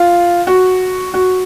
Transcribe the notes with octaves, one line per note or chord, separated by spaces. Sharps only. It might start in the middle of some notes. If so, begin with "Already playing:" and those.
Already playing: F4
F#4
F#4